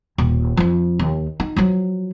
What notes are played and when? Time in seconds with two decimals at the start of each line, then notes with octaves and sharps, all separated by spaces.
0.18 D#1
0.57 F2 F3
0.99 D#2
1.40 D#4
1.56 F3 F#3